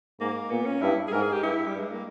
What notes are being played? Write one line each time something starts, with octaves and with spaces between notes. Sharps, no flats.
G#2 A#3
A#2 B3
C#4
G2 E4
G#4
G#2 A#4
G#4
G4
G2 E4
G3
G2
G#3
A#3